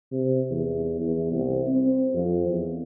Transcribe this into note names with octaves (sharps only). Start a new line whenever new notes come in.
C3
E2
E2
C2
C4
F2
E2